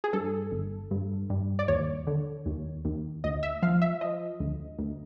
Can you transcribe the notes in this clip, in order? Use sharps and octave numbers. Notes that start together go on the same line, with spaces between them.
G#4
G2 A4
G1
G2
G2
D5
D#2 C#5
D3
D#2
D#2
D2 D#5
E5
F3 F5
E5
F3 D#5
D2
D2